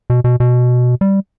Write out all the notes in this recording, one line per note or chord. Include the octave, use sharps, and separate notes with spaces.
B2
B2
B2
G3